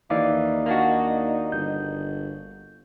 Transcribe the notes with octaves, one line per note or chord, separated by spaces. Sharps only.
D#2 E3 D#4 D5 F5 D6
A#3 D4 F#4
G1 G6